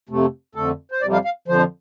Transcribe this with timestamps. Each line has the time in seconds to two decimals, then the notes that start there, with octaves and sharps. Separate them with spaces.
0.09 F2 C3 A3
0.55 F2 D3 A3 A4
0.92 C5
1.01 F2 C3 G3 D5
1.13 F5
1.25 F5
1.48 F2 D3 F3 C5